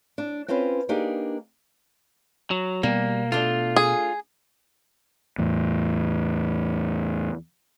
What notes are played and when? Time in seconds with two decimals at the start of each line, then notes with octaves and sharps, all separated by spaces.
0.18 D4
0.48 C4 C#4 F4 B4 C5
0.89 A#3 D4 D#4 G4 G#4
2.51 F#3
2.83 B2 G3 A#3 B3
3.32 A3 D4 F4
3.76 G#4
5.38 E2 A2